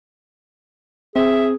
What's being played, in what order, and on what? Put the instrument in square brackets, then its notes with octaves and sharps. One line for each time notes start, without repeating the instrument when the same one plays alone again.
[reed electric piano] C4 [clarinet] G#4 [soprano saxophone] E5